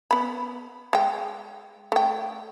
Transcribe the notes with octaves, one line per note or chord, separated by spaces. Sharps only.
B3 B5
G#3 G5
A3 G5